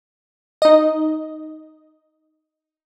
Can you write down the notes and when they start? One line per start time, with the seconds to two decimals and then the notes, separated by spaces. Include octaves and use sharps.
0.62 D#4 D#5